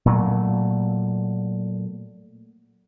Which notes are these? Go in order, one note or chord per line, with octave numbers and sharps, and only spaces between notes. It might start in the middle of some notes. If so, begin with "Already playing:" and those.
A#2 F#3 A3